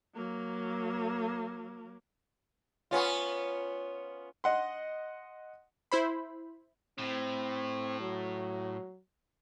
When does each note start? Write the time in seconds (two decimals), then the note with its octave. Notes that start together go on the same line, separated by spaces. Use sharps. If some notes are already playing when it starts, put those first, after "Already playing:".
0.15 F#3 A#3
2.91 B3 C#4 F4
4.44 D#5 F#5 C6
5.92 E4 C5 B5
6.99 A2 C4
8.00 F#3